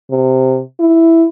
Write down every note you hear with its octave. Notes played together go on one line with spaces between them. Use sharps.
C3
E4